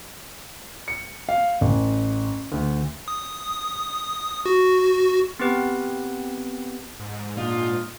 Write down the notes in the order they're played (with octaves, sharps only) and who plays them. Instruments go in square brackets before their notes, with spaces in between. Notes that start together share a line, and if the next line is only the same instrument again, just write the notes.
[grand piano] C#7
F5
A1
D2
[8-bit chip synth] D#6
F#4
[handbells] B3 C4 G4 B4
[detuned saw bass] G#2
[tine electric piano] A#2 [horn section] D4 D#4 F4